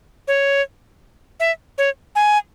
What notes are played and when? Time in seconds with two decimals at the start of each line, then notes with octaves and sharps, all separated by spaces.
0.28 C#5
1.40 E5
1.78 C#5
2.15 G#5